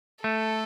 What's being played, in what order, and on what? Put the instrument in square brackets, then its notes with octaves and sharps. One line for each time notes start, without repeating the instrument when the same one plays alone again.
[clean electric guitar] A3 [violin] A4